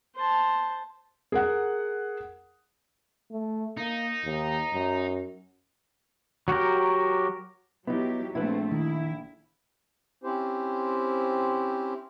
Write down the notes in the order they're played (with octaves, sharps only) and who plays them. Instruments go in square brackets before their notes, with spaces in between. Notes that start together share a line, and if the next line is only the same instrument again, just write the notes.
[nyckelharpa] C5 A5
[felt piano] G#4 A#4 F#5
[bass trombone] A3
[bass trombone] A#3 [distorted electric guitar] D#4
[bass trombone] D#2
F#2
[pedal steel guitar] F#3 F#4 G4 A#4
[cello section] F#3 G4 [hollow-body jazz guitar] B3 D#4 [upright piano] E4
[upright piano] A#1 [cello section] A3 C4 [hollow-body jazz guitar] E4 B4
[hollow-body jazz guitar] D#3 [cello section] E4
[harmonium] C4 C#4 E4 G4 C5